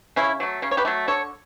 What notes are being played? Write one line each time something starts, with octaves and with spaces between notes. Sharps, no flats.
C#3 C#4 E4
F#3 A3
C#3 C#4
C#5
G4 B4
F#3 A3
D3 A4 C#5